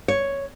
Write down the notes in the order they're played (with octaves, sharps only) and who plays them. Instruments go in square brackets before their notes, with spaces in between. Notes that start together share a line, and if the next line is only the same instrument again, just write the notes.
[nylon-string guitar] C#5